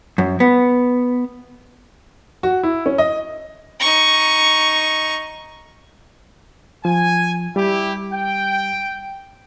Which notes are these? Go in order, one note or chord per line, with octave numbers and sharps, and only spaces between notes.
F#2
B3
F#4
E4
C#4
D#5
D#4 C#6
F3 G#5
G3 E4 G4
G5